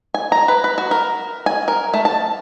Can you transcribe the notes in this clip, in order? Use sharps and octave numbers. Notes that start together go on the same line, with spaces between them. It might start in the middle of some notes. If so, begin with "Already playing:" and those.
G#5
A#5
B4
B4
F#4
A#4
G#5
A#4
A3
A5